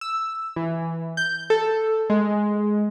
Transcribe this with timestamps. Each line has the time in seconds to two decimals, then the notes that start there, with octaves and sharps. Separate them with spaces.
0.01 E6
0.56 E3
1.17 G6
1.50 A4
2.10 G#3